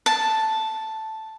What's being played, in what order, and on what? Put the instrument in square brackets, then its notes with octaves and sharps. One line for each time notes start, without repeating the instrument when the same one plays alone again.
[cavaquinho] A5